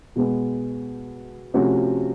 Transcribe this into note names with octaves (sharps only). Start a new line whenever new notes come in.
B2 G#3 B3
C3 F3 A3 C#4 F#4